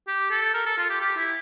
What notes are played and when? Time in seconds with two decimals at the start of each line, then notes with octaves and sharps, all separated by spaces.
0.08 G4
0.31 A4
0.54 A#4
0.66 A4
0.78 F4
0.90 G4
1.01 G4
1.17 E4